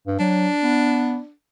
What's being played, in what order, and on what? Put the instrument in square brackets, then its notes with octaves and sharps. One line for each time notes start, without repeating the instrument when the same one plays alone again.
[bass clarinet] G2
[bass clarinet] F#3 [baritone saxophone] D4
[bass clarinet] B3